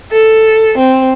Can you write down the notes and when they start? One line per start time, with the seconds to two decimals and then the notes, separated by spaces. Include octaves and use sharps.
0.11 A4
0.78 C4